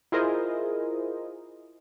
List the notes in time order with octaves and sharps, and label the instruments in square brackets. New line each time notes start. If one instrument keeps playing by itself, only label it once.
[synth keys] E4 F4 G#4 A#4 C5 D#5